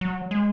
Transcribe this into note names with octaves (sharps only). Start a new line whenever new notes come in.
F#3
G#3